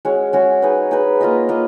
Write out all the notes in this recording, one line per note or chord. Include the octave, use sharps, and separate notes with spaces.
G#3 C#4 F#4 C#5
G#3 C#4 F#4 C#5
D#4 G#4 B4
D#4 G#4 B4
A#3 F4 B4 D#5
A#3 F4 B4 D#5